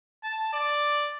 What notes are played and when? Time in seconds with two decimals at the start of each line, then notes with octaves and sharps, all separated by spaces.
0.23 A5
0.53 D5